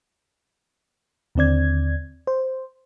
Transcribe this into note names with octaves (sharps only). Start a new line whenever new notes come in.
D#2 D3 C4 D5 G#6
C5